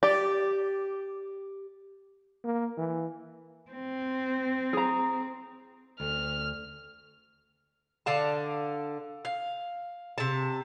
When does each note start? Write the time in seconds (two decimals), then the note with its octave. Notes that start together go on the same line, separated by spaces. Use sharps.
0.03 G4 D5
2.44 A#3
2.78 E3
3.71 C4
4.73 G#4 A#5
6.00 D2 F6
8.06 D3 D5 F5 A5
9.25 F5
10.18 C3 A5